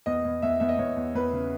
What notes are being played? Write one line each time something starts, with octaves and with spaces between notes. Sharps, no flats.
E2 D#5
E2
E2 E5
E2 E5
D#5
E2 C#5
E2
E2 B4
C#3